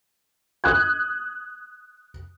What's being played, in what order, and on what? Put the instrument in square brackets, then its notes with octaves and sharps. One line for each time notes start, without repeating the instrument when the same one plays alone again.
[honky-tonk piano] D#6 F#6 G#6